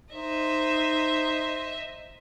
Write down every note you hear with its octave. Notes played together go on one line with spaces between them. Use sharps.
D#4 C5 D#5 E5